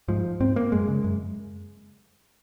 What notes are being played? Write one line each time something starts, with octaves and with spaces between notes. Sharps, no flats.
G#2 F3
G#2 C4
A#3
F#2 G#3
C#3
F#2